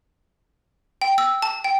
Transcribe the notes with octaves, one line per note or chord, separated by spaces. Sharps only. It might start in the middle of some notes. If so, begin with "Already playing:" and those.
G5
E6
A5
G5